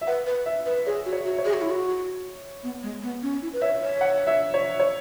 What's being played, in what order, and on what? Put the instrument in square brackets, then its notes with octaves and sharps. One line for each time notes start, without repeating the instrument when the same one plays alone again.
[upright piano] E5
[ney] B4 [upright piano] F#5
[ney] B4
[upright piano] E5
[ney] B4
[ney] G#4 [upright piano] C#5
[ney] F#4
[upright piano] C#5
[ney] F#4
[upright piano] C#5
[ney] G#4
F#4
E4
F#4
B3
G#3
B3
C#4
E4
B4
[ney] C#5 [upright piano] E5
[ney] C#5
[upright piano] F#5
E5
C#5
C#5